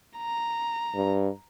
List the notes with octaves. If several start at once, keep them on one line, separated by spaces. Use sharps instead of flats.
A#5
G2